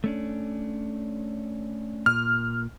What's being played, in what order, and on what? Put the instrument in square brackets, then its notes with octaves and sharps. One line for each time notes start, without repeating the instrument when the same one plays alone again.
[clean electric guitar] A3 C#4 D4
[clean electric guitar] A#2 [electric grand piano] F6